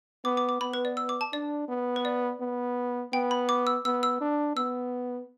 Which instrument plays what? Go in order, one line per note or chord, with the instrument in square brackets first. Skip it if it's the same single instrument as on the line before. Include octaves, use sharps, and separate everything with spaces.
[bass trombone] B3 [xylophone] D6
[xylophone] D6
D6
[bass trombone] B3 [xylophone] B5
[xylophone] B4
D5
E6
D6
A5
[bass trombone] D4 [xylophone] D5
[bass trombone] B3
[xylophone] B4
D5
[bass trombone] B3
[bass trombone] B3 [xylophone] G5
[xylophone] B5
D6
E6
[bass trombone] B3 [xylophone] E6
[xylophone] E6
[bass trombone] D4
[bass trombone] B3 [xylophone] E6